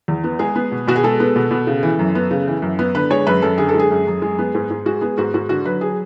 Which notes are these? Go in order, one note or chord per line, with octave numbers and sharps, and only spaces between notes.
E2
B3
G#3 G#4
B3
B2
B2 F#4
G#4
G#3 A4
B3
B2
B2
C#3
E3
F#2
B3
C#3
E3
F#2
B3
D3 B4
G#3 C#5
F#2 B4
F#2 A4
D3 G#4
A4
G#3
G#4
F#2
F#2
G#3
B3
G#2
G#2
G#3 F#4
B3 G#4
G#2 F#4
G#2 F#4
D3 F#4
F#3 B4
G#4